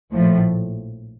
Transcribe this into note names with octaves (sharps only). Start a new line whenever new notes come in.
A#1 A2 F3